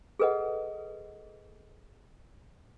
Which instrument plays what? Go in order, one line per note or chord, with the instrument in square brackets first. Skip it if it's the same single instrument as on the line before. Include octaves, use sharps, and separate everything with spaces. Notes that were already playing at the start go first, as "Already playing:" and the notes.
[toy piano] G#4 A4 B4 D#5 F#5